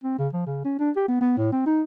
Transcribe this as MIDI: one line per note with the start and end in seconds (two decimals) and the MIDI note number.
0.04 0.18 60
0.19 0.28 49
0.33 0.44 53
0.46 0.63 49
0.65 0.75 61
0.79 0.91 62
0.96 1.04 67
1.08 1.21 59
1.21 1.34 59
1.38 1.52 45
1.52 1.65 60
1.66 1.82 63